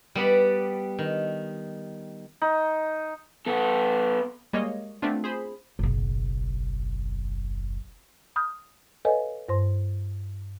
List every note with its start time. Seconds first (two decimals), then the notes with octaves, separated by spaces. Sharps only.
0.15 G3 B3 B4 D5
0.99 D#3
2.42 D#4
3.46 B3 A4
4.53 G3 G#3 A#3 C#5 D#5
5.02 A3 B3 C4 D4 F4
5.24 G#4 C5 B5
5.79 F#1 B1
8.36 B5 D#6 F6 G6
9.05 A4 B4 C#5 D#5 F5 G#5
9.49 G2 C5 C6